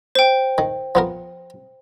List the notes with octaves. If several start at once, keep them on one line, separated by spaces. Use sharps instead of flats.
C5 G5
D#3
F3 B3 A#4